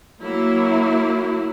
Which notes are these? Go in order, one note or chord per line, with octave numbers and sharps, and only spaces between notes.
F#3 A#3 E4